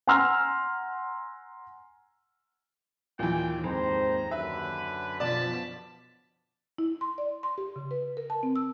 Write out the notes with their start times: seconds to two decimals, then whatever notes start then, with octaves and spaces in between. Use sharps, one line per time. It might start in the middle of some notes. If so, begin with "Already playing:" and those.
0.07 F#5 G#5 A#5 C6 E6 F6
3.19 D#2 A#2 E3 G5
3.64 F2 G#2 C4 C5 A#5
4.31 F#2 D3 B4 E5
5.20 B2 F3 D5 A5 B6
6.78 E4
7.01 C6
7.18 D5
7.43 C6
7.58 G4
7.76 C#3
7.91 B4
8.17 A#4
8.30 A5
8.43 C4
8.56 E6